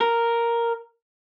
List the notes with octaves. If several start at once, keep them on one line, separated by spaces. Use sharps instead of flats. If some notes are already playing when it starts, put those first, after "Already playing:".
A#4